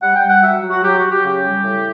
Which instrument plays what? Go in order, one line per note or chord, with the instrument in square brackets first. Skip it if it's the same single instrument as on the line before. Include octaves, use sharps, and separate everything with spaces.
[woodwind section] G3 F#5
G5
G3
F#5
F#3 E5
F#3
F#4
F#3 G4
F#4
F#3
G4
C#3 G4
G3
A2